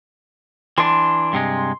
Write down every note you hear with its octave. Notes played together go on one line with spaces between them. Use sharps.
E3 D4 C6
G2 C3 G#3